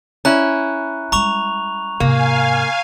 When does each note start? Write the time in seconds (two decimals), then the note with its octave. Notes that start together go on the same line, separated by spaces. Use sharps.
0.25 C#4 E4 A#5 F#6
1.12 G3 G#3 A#5 C#6 F7
2.00 G#2 C3 A#3 F5 G#5